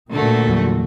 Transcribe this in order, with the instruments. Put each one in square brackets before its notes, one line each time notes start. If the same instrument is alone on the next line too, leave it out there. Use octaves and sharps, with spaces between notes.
[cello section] D2 D3 F#4 [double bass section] A#2 [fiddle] A3
[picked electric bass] E2 F#3 G3